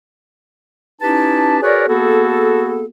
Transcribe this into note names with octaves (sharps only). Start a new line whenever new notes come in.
C#4 D#4 E4 G4 B4 A5
F#4 G#4 A#4 B4 C#5 D5
A#3 B3 F#4 G#4 A4